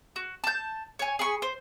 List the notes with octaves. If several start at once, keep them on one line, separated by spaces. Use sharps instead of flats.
F#4
A5 G6
C#5 G#5
G#4 G#5 B5 C#6
C5